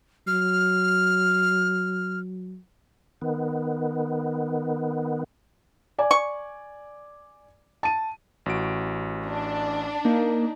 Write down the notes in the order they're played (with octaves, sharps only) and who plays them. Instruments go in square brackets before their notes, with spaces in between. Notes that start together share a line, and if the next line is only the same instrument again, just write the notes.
[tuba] F#3 [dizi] F6
[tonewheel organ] D#3 B3
[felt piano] D5 G#5
[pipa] C#6
[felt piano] A5 D#7
[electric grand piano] A1 F#4 D7
[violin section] D4
[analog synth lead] A#3 [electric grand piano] D#4